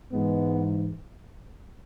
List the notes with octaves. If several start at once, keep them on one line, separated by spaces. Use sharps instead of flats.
G#2 E3 G#3 B3